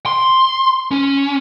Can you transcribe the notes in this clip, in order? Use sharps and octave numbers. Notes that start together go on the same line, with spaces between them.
C6
C#4